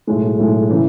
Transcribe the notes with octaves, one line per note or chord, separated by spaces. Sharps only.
B1 A2 G#3
B1 A2 G#3
C#3 E3